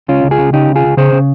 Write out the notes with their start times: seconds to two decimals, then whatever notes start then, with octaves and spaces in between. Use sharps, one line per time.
0.08 C#2 C#4 F4
0.24 C#2
0.31 F4 G#4
0.38 C#3
0.53 C#3 D#4 G4
0.68 C#2
0.76 F4 G#4
0.83 C#2
0.97 C#3 G#4 C5
1.12 C#3